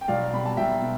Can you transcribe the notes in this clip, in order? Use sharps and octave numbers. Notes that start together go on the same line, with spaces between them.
G5
B1 D5 F5
B2 G3 B5
A5
B1 E5 G5
B2